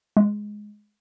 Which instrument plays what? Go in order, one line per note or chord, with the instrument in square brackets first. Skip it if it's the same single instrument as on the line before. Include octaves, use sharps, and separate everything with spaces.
[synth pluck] G#3